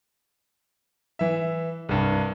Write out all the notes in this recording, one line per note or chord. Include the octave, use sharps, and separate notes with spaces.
E3 E5
C2 G2